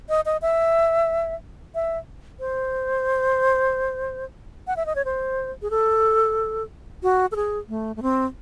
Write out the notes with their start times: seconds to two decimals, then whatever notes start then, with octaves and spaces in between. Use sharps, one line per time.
0.09 D#5
0.26 D#5
0.42 E5
1.75 E5
2.40 C5
4.67 F#5
4.77 E5
4.86 D#5
4.95 C#5
5.05 C5
5.62 G#4
5.70 A4
7.03 F#4
7.32 A4
7.36 G#4
7.69 A3
7.96 A3
8.02 C4